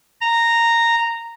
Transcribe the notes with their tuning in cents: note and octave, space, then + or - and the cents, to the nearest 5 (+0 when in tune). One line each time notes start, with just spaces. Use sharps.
A#5 -10